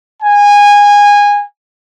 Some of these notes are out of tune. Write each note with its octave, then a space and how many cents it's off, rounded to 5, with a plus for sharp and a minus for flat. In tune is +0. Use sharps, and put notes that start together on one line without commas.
G#5 -20